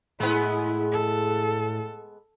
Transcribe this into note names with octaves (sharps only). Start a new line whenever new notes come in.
A2 G#3 B3 E4
A4